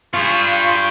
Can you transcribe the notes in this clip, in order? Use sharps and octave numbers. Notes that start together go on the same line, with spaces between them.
G2 G3 F4 G#4 C#6 E6